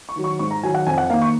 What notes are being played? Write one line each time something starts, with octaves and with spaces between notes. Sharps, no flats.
C#6
D#3 F#3
C#6
G#2 C#6
A#5
D#3 F#3 G#5
F#5
F2 G#5
F#5
D#3 A#3 F5
C#6